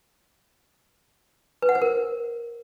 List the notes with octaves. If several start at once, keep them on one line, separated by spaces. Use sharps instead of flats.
B4
F#5
C5
A#4